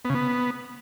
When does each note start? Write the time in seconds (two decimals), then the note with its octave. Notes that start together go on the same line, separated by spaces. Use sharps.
0.05 B3
0.10 C#3
0.15 B3